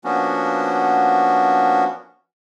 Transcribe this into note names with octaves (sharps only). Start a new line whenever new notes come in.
F3 A#3 B3 C#4 D4 F#4